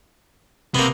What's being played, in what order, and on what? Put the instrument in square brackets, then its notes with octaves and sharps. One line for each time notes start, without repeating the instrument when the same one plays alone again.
[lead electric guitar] C3 [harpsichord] A#3 B3